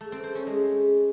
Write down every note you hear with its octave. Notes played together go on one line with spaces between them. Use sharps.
A3
C4
C5
C#4
G#3